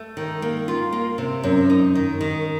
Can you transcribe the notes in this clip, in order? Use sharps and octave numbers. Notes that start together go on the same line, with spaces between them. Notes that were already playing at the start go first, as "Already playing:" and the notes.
Already playing: A3
D#3
A#3
F4
A#3
C3
F#2
D#4
D#3
D#3